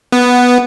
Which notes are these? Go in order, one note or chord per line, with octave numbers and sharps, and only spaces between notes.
B3